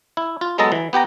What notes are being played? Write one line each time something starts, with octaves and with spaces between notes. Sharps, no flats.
E4
F4
F#3 G#3 B3 A4 D#5 A#5
E3
B3 G4 G5 A#5